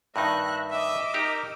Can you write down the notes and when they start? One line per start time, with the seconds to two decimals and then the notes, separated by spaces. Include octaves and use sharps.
0.16 G2 D#3 D#4 E5 F#6 A#6
0.71 D#5 E5 D6 E6
1.14 D#4 G4 A#4 A#5